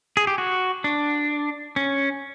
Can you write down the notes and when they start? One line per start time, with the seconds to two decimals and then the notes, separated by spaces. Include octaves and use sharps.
0.17 G#4
0.27 G4
0.38 F#4
0.84 D4
1.76 C#4